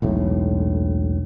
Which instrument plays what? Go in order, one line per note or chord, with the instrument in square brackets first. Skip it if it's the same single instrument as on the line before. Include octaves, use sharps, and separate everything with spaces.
[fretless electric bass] E1 B1 A2